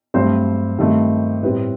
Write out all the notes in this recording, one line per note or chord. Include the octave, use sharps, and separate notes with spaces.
G2 F#3 A3 C4 C5
G2 D#3 A3 C4
A2 G3 C4 B4